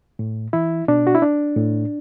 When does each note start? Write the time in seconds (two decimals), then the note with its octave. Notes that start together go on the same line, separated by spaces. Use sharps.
0.19 A2
0.53 E3 E4
0.88 B2 D4
1.07 F#4
1.15 E4
1.22 D4
1.57 A2